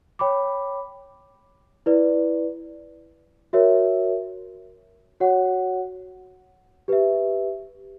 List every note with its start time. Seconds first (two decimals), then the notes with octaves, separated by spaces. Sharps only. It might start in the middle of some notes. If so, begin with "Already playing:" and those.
0.19 C#5 G5 B5 D6
1.86 E4 B4 D5
3.53 F#4 A#4 C#5 E5
5.20 F#4 C#5 F#5
6.88 G4 B4 E5